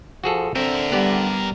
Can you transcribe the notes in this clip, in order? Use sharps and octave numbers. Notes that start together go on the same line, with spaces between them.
F3 F#4 G#4 A4
D3 C4 A#4 E5
G3 B3 G4 D5